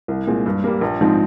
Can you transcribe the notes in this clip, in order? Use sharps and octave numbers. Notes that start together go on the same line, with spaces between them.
C2
A#2 G#3 C4
G2
G3 A#3
A#1
G#2 F3 C4 D#4